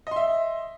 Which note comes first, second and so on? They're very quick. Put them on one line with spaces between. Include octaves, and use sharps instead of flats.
D#5 C6 E5